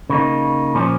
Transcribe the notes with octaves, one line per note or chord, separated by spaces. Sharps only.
C#3 A#3 D#4
A#2 F3 C#4